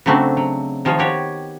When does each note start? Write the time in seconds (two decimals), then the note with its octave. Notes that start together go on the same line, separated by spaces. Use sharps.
0.06 C#3 F#3 A3 C4 D4 F#4
0.37 F#3
0.85 D#3 F3 F4 G#4 C#5
0.99 B3 F#4 G4 C#5